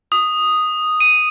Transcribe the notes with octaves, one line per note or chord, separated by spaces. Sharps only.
D#6
D#7